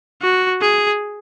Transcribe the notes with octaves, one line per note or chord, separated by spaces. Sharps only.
F#4
G#4